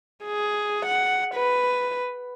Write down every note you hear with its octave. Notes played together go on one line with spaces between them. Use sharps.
G#4
F#5
B4